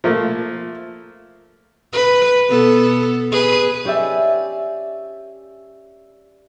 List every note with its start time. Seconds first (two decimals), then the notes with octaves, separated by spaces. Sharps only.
0.04 F3 A3 A#3
1.93 B4
2.50 B2 B3 A4
3.32 G#4 B4
3.85 C#4 G4 D5 E5 G#5